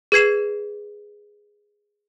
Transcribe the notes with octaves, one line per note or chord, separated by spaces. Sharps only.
G#4 B4 G#6 C7 E7